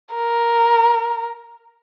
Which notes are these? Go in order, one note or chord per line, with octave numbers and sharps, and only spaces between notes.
A#4